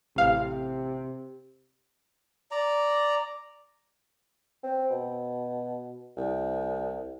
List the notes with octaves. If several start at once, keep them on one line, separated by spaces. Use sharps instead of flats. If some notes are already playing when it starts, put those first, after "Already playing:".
A1 C3 F5
D5 A#5
C4
B2
C2